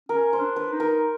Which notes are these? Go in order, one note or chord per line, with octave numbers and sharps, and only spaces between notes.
C#4 A#4
C5
D4
B4
D#4
A#4